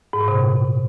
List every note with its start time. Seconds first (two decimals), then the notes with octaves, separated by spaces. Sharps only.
0.13 G#2
0.21 A#2
0.28 C3